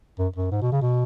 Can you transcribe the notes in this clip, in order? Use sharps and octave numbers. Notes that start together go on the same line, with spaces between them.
F#2
F#2
G#2
B2
C#3
B2